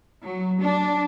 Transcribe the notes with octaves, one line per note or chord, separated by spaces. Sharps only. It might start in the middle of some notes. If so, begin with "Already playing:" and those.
F#3
D4